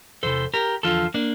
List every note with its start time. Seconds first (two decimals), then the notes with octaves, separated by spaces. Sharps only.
0.23 E2 C3 E3 A4 C5
0.54 G4 A#4
0.83 E2 D3 F3 F4 A4
1.14 A#3 D4